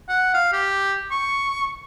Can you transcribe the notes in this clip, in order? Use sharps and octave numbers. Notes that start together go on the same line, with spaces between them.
F#5
F5
G4
C#6